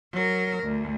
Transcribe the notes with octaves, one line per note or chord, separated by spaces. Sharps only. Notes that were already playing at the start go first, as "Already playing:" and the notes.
F#3 A#4
D2